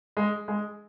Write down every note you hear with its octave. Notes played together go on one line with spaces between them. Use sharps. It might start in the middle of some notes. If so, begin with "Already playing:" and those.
G#3
G#3